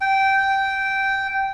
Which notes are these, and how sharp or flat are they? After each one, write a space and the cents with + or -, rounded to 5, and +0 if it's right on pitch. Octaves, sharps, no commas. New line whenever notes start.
G5 -10